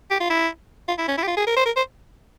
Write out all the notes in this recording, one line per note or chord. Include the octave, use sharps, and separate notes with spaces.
G4
F4
E4
F4
E4
C#4
E4
G4
F4
G#4
A#4
C5
A#4
C5